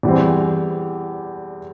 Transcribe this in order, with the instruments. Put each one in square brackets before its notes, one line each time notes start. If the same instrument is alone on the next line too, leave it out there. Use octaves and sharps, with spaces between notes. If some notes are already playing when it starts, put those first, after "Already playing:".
[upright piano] E2 E3 G3 C4